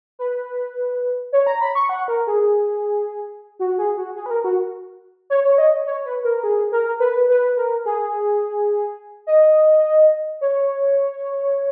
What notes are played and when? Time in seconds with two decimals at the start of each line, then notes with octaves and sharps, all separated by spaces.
0.19 B4
1.32 C#5
1.47 A#5
1.61 B5
1.75 C#6
1.89 F#5
2.08 A#4
2.27 G#4
3.59 F#4
3.78 G#4
3.97 F#4
4.16 G#4
4.26 B4
4.30 A#4
4.44 F#4
5.30 C#5
5.45 C#5
5.58 D#5
5.86 C#5
6.06 B4
6.24 A#4
6.43 G#4
6.72 A#4
7.00 B4
7.29 B4
7.57 A#4
7.86 G#4
9.27 D#5
10.41 C#5